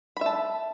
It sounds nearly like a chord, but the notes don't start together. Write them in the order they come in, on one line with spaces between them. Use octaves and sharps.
B5 E5 A5